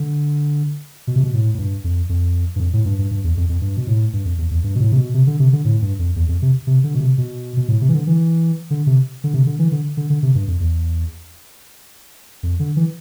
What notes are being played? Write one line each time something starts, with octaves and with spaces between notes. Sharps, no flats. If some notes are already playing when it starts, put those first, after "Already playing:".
Already playing: D3
B2
C3
B2
A2
A2
G2
F2
F2
G2
F2
A2
G2
G2
G2
E2
F2
F2
G2
B2
A2
G2
F2
E2
E2
G2
B2
A2
C3
B2
C3
D3
C3
D3
A2
G2
F2
E2
F2
C3
C3
D3
B2
C3
B2
B2
A2
C3
E3
D3
E3
D3
C3
D3
C3
D3
E3
D3
D3
D3
C3
G2
F2
E2
F2
D3
E3